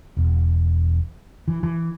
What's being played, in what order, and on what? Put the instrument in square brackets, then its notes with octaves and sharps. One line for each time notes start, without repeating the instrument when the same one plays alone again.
[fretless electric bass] E1
E3
E3